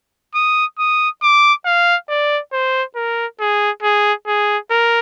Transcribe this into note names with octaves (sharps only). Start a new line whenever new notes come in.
D#6
D#6
D6
F5
D5
C5
A#4
G#4
G#4
G#4
A#4